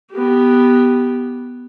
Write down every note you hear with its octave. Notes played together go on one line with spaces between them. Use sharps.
B3 G4